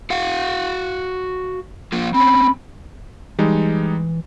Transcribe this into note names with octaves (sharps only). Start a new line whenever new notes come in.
F#4 F5 F#5
F3 A#3 F4
C4 C#4 B5
E3 G3 G#3 D#4